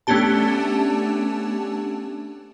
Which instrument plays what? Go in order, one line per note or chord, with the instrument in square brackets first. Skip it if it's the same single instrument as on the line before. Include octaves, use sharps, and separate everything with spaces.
[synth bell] A3 B3 C#4 D4 G4 A5